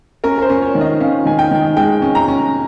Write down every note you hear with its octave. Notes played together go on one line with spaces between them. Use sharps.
C#4 A#4
A#4
C5
C#4
C#5
D#3
D#5
C#4 F5
D#3 G#5
G5
D#3
G#3 G5
C#4
A#5
C#4